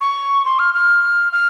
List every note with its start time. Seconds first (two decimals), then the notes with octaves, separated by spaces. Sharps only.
0.01 C#6
0.45 C6
0.59 F6
0.74 F6
1.33 F6